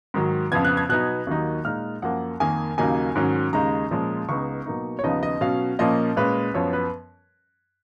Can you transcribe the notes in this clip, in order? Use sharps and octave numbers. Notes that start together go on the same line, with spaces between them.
G#2 D#3 F#3
F2 C#3 F3 B3 G#6
F#6
G#6
B2 F#3 B3 D#4 F#6
D#2 D#3 F#3 A#3 D#4
A#2 G#3 D#4 F6
F#2 F3 A#3 F#5
F2 D#3 A#3 G#5
D#2 C#3 F#3 A#3 D#4 G#5
G#2 D#3 F#3 C#4
D#2 C#3 G#3 D#4 A#5
A#2 F3 G#3 C#4
C#2 C#3 G#3 B3 D#4 C#6
B2 F#3 A#3 D#4
C#5
D#2 C#3 F3 B3 D#4 D#5
D#5
B2 F#3 C#4 F5
A#2 F3 A#3 C#4 D#5
A#2 G#3 C#4 B4
F#2 F3 B3 C#5
B4